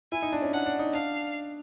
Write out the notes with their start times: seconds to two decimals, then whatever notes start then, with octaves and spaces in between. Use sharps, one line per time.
0.12 E4 G#5
0.22 D#4
0.33 D4
0.42 C#4
0.53 D4 F#5
0.66 D4
0.79 D#4
0.93 D4 F5